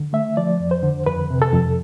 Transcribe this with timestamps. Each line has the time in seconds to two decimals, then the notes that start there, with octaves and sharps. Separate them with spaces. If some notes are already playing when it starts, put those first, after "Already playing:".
Already playing: D3
0.13 A3 E5
0.37 F3 D5
0.60 F2
0.71 C5
0.83 D3
1.06 F2 B4
1.30 C3
1.42 A4
1.53 F2